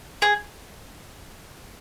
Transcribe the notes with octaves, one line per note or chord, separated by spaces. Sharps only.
G#4